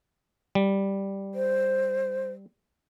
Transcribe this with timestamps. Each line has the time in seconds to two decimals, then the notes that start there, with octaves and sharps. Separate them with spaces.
0.55 G3
1.35 C5